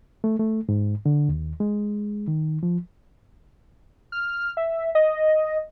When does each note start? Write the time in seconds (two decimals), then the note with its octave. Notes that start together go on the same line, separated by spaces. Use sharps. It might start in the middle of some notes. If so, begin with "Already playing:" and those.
0.24 A3
0.40 A3
0.69 G#2
1.06 D3
1.29 D#2
1.60 G#3
2.28 D#3
2.63 F3
4.12 F6
4.57 E5
4.95 D#5